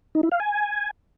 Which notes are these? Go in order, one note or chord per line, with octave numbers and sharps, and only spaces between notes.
D#4
E4
F5
G#5